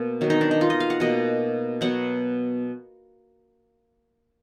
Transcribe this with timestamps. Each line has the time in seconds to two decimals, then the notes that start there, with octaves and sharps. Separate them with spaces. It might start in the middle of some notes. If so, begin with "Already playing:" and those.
Already playing: B2 A#3
0.21 D#3 F#3 B3
0.30 D#4
0.41 D4
0.51 D#4
0.61 F4
0.70 D#5
0.80 F5
0.90 F#5
1.00 B2 A#3 D#5
1.81 B2 F#3 B3 F#5